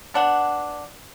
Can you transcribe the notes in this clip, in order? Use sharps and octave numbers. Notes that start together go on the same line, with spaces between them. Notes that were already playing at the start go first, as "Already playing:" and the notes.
B3 D4 F#5